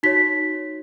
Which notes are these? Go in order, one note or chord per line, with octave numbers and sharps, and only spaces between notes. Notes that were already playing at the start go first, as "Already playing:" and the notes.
D#4 F#4 C#5 B6